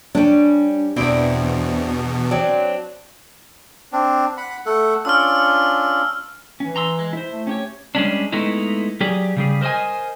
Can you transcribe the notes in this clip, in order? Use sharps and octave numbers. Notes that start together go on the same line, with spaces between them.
G3 C#4 D4
E2 B2 C4 E4 D5
F#3 C4 D4
C4 D4
F#5 B5
A3 A4 F#5
C#4 D4 F4 E6 F6
E3 C#4
A#5 C6 E6
G#3
E4 C5
A3
C#4 G4 C#5
G3 G#3 C#4 D4
G#3 A3 B3 D#4 E4
F#3 G4 G#4 D5
C#3 G3 G#4
A#4 C5 D5 D#5 G#5